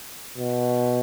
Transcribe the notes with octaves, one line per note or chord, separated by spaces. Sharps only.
B2